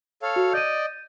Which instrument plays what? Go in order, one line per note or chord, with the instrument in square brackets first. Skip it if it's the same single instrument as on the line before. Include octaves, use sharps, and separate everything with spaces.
[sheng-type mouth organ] A4 C#5 F5
[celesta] F#4
[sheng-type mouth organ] D5 D#5 [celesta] G6 D#7